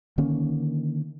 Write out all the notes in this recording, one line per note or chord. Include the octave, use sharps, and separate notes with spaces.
D3 D#3 A#3 C#4